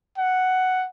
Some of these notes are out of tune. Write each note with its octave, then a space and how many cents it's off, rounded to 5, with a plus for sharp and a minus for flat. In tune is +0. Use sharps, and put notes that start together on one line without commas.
F#5 +5